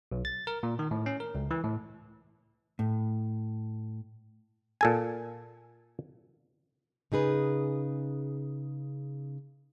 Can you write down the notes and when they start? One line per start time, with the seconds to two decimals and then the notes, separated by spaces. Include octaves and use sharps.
0.12 B1
0.25 A6
0.47 A#4
0.63 A#2
0.79 D#3
0.91 A2
1.06 C#4
1.20 A#4
1.35 C#2
1.51 E3
1.64 A2
2.79 A2
4.81 A#2 A4 G#5
7.12 C#3 D#4 G#4 B4